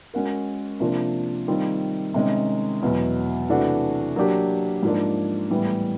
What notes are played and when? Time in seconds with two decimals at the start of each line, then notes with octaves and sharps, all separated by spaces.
0.14 G#3 C#4 F#4 A#4
0.80 C3 F3 A#3 D4
1.48 D#3 G3 C4 F4
2.14 C3 D#3 G#3 C#4
2.82 E2 B2 F#3
3.49 C3 E3 A3 D4 F#4
4.16 F#3 A#3 D4 G4
4.83 G#2 F3 A#3 D4
5.50 A2 E3 G3 B3